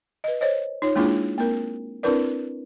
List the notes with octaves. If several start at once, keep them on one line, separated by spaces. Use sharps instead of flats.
B4 D#5
C5 C#5 D#5
D#4 F4 C#5
G#3 A#3 D4 E4 F4 G#4
A#3 C4 A#4
C4 D4 E4 A#4 B4 D5